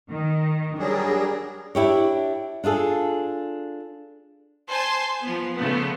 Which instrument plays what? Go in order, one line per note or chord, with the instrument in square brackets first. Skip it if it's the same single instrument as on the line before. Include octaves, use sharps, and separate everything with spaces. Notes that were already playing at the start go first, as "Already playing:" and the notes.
[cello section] D#3
[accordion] F#3 G3 G#4 [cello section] D4 A#4
[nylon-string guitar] D4 E4 G4 C#5
D4 F4 G#4 A4
[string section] C5 G#5 A5 C6 G6
F3 B3
C#3 F3 A3 B3